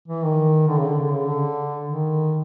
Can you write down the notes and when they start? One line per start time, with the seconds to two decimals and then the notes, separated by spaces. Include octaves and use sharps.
0.08 E3
0.23 D#3
0.68 D3
0.78 C#3
0.87 D3
0.98 D3
1.12 C#3
1.27 D3
1.86 D#3